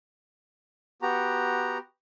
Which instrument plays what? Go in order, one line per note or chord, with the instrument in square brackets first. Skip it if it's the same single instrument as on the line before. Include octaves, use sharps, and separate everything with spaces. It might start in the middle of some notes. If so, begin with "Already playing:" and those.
[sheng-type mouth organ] B3 F#4 G4 A#5